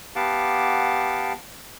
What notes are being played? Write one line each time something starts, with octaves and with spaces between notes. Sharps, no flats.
B3 G4 F5 F#5 A5 D6